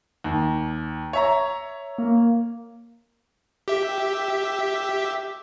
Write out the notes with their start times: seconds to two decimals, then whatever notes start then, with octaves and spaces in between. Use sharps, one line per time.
0.24 D#2
1.13 C#5 E5 A#5
1.98 A#3
3.68 G4 E5